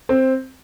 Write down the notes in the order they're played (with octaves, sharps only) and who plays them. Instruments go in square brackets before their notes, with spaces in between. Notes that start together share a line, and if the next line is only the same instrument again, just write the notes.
[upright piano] C4